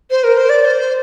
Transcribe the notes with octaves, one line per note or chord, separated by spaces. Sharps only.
C5
A#4
C5
D5
D5
C5